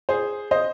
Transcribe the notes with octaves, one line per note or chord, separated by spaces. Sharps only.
G#4 C5
C5 D#5